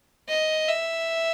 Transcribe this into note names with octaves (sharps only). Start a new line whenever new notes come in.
D#5
E5